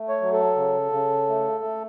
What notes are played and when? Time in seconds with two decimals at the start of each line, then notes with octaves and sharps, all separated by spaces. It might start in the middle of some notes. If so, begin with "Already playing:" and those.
Already playing: A3
0.09 C#5
0.21 F#3
0.33 A4
0.56 C#3
0.92 C#3
1.29 A3
1.64 A3